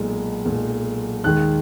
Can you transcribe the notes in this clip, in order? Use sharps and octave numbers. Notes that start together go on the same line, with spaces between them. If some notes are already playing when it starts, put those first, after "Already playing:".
Already playing: B1 A#2 G#3
B1 A#2 G#3
D#2 D#3 G#3 F#6